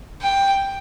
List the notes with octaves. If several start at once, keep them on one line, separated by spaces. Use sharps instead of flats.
G5